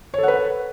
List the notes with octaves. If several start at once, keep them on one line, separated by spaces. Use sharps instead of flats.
A4 B4 C#5 F#5